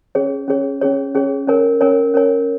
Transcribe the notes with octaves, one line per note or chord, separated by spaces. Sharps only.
C#4 G#4 C#5
C#4 G#4 C#5
C#4 G#4 C#5
C#4 G#4 C#5
C#4 A#4 C#5 G#5
C#4 A#4 C#5 G#5
C#4 A#4 C#5 G#5